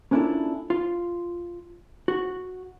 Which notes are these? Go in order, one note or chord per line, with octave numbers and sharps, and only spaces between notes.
A#3 C#4 D4 E4 F4 A4
F4
F#4